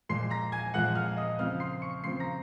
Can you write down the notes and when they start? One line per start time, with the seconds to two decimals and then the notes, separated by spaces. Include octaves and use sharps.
0.09 A#2 F3 G#3 C6 C7
0.30 A#5 A#6
0.52 G#5 G#6
0.74 A#2 F3 G#3 F#5 F#6
0.95 F5 F6
1.17 D#5 D#6
1.39 C#3 F3 C4 F5 F6
1.60 C6 C7
1.82 C#6 C#7
2.03 C#3 F3 C4 C6 C7
2.20 A#5 A#6